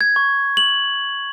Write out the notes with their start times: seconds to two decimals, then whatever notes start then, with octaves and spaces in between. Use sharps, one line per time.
0.01 G#6
0.16 C#6
0.57 F#7